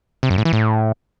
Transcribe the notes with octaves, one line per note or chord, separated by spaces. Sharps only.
C3
F#2
A2
E3
A2